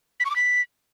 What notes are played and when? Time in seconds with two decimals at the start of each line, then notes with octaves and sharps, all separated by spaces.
0.20 B6
0.25 C#6
0.31 D6
0.36 B6